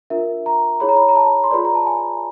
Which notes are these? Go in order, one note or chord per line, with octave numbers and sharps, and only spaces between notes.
D4 F4 A#4 E5
A#5
E4 G#4 C#5 B5
A#5
B5
A#5
A5
C6
F4 G#4 B4 D5 B5
A#5
A5
G#5